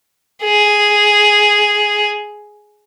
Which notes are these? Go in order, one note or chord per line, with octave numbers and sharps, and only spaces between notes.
G#4